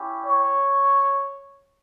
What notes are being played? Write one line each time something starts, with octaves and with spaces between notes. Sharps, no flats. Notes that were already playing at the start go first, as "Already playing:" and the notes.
Already playing: C#4 E4 G4
C#5